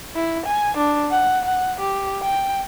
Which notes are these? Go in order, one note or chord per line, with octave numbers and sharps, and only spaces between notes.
E4
G#5
D4
F#5
F#5
G4
G5